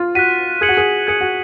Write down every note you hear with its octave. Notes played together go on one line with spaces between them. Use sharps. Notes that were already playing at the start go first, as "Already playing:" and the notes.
Already playing: F4
F#4 F#6 B6 D#7
G#4 G#6 C#7 F#7
F#4
G#4
G#4 G#6 C#7 F#7
F#4